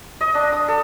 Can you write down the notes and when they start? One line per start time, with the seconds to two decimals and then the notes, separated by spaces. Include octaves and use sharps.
0.21 D#5
0.35 D4
0.52 D#6
0.68 A4